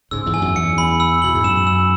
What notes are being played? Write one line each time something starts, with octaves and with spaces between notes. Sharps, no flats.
G#2 C#3 E6
E2 G#2
G#5
F#2
E2 C#7
B5
E6
B2 F#7
G#2
F#2 E7
E6